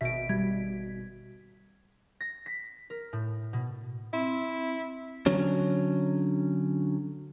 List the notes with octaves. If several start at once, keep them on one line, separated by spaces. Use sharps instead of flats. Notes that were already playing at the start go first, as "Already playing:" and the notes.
G#1 B2 E5 B6 D7
G3 G#6
A#6
B6
A#4
A2
B2
C4 E4
D3 F#3 C#4